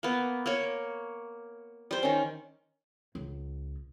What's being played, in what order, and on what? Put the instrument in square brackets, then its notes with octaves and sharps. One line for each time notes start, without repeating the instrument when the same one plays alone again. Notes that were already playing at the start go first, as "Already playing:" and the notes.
[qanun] A#3 B3
A#3 C#5
G3 C5
D#3 C#4
[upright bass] C#2